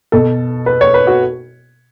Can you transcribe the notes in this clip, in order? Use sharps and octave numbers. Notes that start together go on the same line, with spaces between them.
B2 A4
B4
C#5
B4
F#4